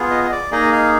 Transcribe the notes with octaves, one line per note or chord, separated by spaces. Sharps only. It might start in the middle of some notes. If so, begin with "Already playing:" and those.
Already playing: B3 F4 G#4
D#5
D#5
D5
A#3 D#4 G#4 D#5
F5